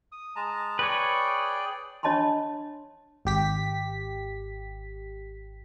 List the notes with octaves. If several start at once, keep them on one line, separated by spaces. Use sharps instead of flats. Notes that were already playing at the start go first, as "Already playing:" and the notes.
D#6
G#3 A5 A#5
G#4 B4 C#5 D5 G5
D4 C#5 D#5 A5 B5 C6
G#1 G4 B6